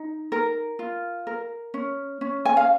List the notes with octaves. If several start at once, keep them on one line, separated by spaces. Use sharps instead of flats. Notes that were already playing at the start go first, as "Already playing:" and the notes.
Already playing: D#4
A#4
F4
A#4
C#4
C#4
G#5
F5